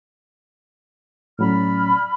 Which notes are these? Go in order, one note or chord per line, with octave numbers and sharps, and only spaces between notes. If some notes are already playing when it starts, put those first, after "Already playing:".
A2 F#3 C#4 D5 B5 F6